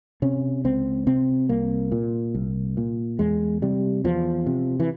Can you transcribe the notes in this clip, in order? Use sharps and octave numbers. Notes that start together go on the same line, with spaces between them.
C3 C#4
C#2 C4
C3 C4
C2 A#3
A#2
C2
A#2
E2 G#3
C3 G3
E2 F3
C3
E3